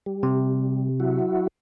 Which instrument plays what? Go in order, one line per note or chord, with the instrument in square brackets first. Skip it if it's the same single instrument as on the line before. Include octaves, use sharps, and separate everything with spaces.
[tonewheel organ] G3
[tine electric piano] C3
[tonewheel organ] F#3 E4 F#4